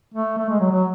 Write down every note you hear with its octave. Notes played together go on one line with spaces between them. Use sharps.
A3
A3
G#3
F#3
F#3